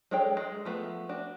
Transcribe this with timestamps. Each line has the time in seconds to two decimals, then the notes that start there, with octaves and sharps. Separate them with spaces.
0.11 G#3 D4 A4 C#5 G5
0.37 G#3
0.65 F3 A3 B3
1.09 D4 F#4